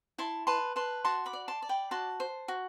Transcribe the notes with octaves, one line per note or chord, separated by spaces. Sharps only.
E4 A5 C6
B4 A5 C6
B4 A5 C6
F#4 A5 C6
B5 D6
D5
A5 C6
D5
G5 B5
F#4 A5 C6
C5
F#4